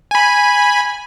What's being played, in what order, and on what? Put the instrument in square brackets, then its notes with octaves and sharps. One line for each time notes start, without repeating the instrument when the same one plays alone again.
[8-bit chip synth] G#5 B5